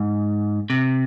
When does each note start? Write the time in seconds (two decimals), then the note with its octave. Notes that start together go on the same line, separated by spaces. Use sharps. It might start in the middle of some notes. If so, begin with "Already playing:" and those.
Already playing: G#2
0.70 C3